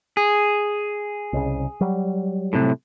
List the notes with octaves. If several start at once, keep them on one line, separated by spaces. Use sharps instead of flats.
G#4
C2 C#3
F#3 G3
A2 C3